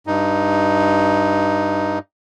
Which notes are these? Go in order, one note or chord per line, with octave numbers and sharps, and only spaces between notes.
G2 D#4